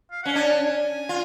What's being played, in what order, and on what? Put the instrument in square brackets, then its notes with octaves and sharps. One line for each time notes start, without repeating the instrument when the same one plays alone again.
[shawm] F5
[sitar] C#4 [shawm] F#5
[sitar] D4 [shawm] G#5
[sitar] F4